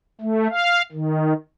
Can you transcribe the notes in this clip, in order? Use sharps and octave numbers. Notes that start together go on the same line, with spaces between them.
A3
F5
D#3